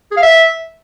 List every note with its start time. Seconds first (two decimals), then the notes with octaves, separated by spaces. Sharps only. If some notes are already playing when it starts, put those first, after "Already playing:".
0.11 G#4
0.17 F5
0.22 E5